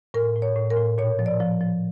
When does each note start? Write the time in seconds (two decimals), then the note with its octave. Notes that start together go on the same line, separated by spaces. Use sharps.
0.14 A2 A#4
0.36 A2
0.42 C#5
0.56 A2
0.70 A#4
0.77 A2
0.98 A#2 C#5
1.19 F3
1.26 D5
1.40 F3
1.61 F3